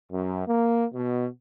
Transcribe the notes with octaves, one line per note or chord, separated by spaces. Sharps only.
F#2
A#3
B2